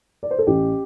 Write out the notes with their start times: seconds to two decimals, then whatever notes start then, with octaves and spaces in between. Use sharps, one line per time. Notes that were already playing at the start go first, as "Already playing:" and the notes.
0.23 D5
0.31 C5
0.39 A4
0.47 A1 G4